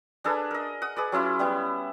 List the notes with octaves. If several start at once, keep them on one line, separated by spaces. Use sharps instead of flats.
D4 G#4 A4 B4
A#4 D#5
F#5 D#6
G#4 B4 D5
F#3 C#4 E4 F4
G3 B3 E4